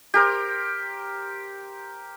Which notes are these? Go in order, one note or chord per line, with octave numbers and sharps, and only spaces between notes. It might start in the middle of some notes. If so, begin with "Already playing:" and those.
G4 A#4 C5